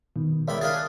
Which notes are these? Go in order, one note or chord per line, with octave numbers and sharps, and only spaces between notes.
B2 D#3
C#2 D#3 D5 E5 B5
D4 F4 G#4 A6